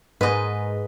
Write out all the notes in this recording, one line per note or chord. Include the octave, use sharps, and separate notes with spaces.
G#2 B4 D#5